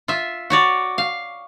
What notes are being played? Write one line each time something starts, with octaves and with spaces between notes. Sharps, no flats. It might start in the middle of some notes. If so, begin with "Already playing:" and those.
F4 E5
F#4 C#5 D5
F5